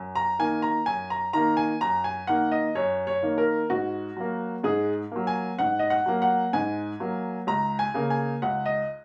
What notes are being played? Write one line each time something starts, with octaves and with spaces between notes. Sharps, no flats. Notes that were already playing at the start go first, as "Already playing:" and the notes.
Already playing: F#2
A#5
D#3 A#3 G#5
A#5
F#2 G#5
A#5
D#3 A#3 A#5
G#5
F#2 A#5
G#5
D#3 A#3 F#5
D#5
F#2 C#5
C#5
D#3 A#3
A#4
G#2 F#4
F#3 A#3
G#2 G#4
F#3 A#3
G#5
G#2 F#5
D#5
F#5
F#3 A#3
F#5
G#2 G#5
F#3 A#3
C#2 A#5
G#5
C#3 A#3
G#5
C#2 F#5
D#5